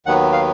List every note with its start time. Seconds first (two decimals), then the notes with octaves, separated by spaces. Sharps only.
0.06 D#2 D#3 F#3 B3 F#5
0.33 F5